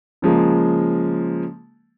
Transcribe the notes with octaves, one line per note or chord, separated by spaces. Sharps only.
C#3 F3 G#3 A#3